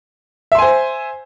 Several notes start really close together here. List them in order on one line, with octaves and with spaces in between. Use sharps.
E5 C6 G#5 C5